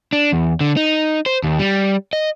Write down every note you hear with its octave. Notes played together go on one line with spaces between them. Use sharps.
D4
E2
D3
D#4
C5
D#2
G3
D#5